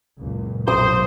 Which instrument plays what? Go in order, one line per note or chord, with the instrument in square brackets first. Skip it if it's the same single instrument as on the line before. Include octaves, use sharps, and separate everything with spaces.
[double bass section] F#1 C#2 A#2
[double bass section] B1 [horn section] C5 [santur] D#6